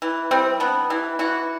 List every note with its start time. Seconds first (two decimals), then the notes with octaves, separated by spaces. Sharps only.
0.02 E3
0.31 G3 C4
0.60 B3 D4
0.90 E3
1.19 E3 F#4